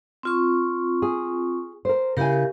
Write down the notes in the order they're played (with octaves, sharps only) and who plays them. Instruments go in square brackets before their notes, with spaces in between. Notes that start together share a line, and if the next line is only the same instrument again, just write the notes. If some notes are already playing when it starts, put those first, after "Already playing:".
[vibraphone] C4 F4 C#6
[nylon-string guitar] G#4
A#4 C5
[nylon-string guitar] C#3 E4 G#5 [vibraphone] G4 A#4